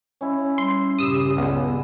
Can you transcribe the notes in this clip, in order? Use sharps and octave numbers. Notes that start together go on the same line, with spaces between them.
C#4 E4 C#5 D#5
G3 C6
G2 A#2 C#3 G4 D#6 E6
C#2 B3 G#4 D5